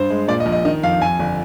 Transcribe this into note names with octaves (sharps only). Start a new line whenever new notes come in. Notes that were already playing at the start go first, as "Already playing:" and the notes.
Already playing: G2 C5
G#3
A#2 D5
D#5
A#1
D#5
D#3 D#5
F2 F5
F2 G#5
G1